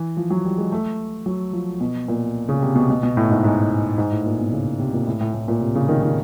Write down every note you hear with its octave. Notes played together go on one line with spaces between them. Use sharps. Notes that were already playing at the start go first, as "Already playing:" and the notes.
Already playing: E3
F3
F#3
G3
G#3
A3
F#3
F3
B2
A#2
C#3
C3
B2
B2
B2
A2
G#2
G#2
G#2
A2
A#2
B2
C#3
C3
A#2
A2
A2
A2
A#2
C3
C#3
D#3
D#3